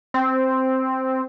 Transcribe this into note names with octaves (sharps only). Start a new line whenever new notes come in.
C4